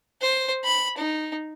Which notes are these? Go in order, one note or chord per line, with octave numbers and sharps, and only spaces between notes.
C5
B5
D#4